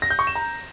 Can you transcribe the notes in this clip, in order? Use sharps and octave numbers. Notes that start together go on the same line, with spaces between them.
A#6
G6
C#6
E7
A#5